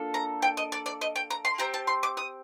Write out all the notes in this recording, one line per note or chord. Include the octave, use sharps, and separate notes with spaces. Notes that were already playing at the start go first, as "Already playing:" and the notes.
Already playing: A#3 D4 F4 A4
A#5
G5
D#5
D5
D5
D#5
G5
A#5
C6
C4 G4 A#5
A5
C6
D6
D#6